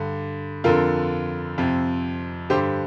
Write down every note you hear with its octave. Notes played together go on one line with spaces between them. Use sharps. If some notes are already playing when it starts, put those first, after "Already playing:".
Already playing: G2 D3
F2 D3 F4 A#4
F2 C3
G2 D3 G4 C5